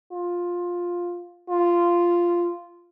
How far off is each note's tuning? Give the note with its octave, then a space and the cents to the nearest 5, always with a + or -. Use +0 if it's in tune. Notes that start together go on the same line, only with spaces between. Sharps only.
F4 +10
F4 -10